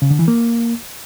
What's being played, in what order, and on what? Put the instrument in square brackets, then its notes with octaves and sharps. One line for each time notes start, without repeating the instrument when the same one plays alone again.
[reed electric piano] C#3
D3
E3
A#3